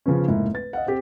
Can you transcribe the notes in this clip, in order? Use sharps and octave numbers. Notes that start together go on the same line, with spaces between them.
C#3 F3 B3 C#4
F1 G#2 A#3 E4
B4 A6
D#5 F5 F#5
C4 G4